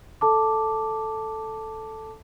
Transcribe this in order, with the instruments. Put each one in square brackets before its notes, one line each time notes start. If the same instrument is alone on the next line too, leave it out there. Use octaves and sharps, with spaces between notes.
[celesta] A4 A5 D6